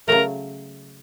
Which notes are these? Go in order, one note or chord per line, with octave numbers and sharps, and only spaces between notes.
C#3 F#3 A3 A#4